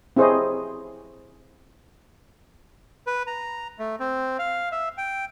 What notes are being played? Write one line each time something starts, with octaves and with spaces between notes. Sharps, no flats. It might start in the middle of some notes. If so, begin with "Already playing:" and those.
C4 E4 G#4 C5 C#5 D#5
B4
A#5
A3
C4
F5
E5
G5